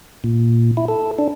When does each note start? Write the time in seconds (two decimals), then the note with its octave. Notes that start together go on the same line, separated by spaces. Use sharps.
0.24 A#2
0.77 E4
0.88 A4
1.18 D4